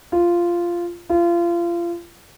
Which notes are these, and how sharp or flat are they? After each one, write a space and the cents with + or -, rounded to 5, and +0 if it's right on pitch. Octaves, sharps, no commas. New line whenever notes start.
F4 -10
F4 -30